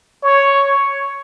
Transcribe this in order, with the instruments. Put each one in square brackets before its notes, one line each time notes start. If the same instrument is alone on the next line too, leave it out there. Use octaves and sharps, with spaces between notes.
[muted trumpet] C#5